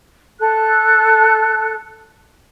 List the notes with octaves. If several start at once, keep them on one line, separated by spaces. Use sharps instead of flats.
A4 F#6